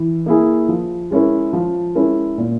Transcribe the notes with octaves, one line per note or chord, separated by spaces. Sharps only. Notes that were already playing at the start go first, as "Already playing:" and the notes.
Already playing: E3
A#3 E4 G#4
F3
G#3 C#4 E4 A#4
F3
G#3 C#4 E4 A#4
A#2